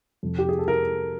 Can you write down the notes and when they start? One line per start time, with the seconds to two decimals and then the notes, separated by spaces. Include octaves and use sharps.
0.23 F2 C3 F3
0.38 G4
0.49 G#4
0.59 A4
0.68 A#4